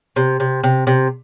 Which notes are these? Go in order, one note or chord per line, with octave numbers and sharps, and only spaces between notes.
C3
C3
C3
C3